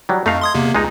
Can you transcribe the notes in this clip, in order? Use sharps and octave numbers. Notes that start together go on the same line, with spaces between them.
F#3 G3
F2 A3 D#4 F5
C6 D#6 G#6
E2 C3 A#3
C#2 G#3 D#4